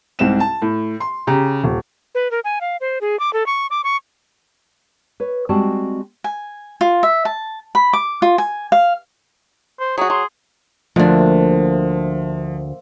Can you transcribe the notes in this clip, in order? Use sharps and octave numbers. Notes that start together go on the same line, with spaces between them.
C2 G#2 C4 E7
A5
A2
C6
C#3 G4 A#5
D#1
B4
A#4
G#5
F5
C5
G#4
D6
A4
C#6
D6
C#6
B4 C#5
G3 G#3 C4 F#4 A5
G#5
F4
E5
A5
B5
D6
F4
G#5
F5
C5
F#3 F#4 G#4
F#3 C6
D2 F3 A#3 D4 C5 E5